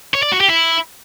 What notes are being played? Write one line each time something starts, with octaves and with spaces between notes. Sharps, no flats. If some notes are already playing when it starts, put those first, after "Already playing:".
C#5
D5
F#4
G4
E4